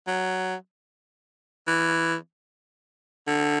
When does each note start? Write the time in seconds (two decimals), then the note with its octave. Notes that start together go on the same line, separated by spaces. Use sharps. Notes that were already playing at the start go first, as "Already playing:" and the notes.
0.07 F#3
1.67 E3
3.27 D3